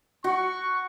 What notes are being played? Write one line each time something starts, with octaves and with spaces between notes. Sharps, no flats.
F#4 C#6